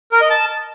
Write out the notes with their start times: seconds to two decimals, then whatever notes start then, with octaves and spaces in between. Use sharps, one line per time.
0.12 A#4
0.21 D#5
0.30 A5